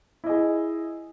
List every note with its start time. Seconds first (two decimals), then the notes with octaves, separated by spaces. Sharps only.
0.24 E4
0.26 D#5
0.29 G#4